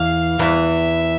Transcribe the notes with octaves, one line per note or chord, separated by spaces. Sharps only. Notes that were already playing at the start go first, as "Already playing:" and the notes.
Already playing: E2 E3 F5
E2 E3 E5